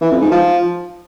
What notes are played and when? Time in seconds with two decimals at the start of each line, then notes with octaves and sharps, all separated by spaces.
0.01 E3
0.11 F2
0.21 G#2
0.31 F3